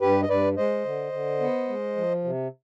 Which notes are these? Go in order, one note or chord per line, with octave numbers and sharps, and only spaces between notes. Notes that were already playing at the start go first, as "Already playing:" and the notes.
G2 G4 B4
D#5
G2 B4 D5
G#3 C5 D#5
D3
D3
B3
G#3
F3
C3